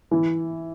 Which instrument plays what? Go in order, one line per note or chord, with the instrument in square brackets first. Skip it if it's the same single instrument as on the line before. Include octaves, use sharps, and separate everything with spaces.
[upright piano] E3